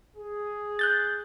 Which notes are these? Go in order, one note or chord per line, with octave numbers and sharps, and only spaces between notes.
G#4
F#6 G6 A6